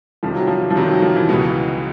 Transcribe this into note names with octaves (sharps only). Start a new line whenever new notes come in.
F2 C3 D#3 F3 G3
F#3
F3
F3
F2 C3 D#3 F#3 G3
F#3
F3
E3
C#2 B2 E3 G#3 B3